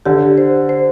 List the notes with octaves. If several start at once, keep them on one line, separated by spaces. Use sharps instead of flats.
D3 G4
C5
C5